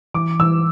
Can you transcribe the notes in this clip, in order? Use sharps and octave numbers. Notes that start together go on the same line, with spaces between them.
E3 D6
E3 E6